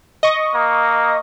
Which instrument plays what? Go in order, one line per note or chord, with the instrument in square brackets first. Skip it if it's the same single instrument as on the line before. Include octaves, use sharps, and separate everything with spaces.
[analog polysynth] D#5 C#6 A#6
[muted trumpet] A#3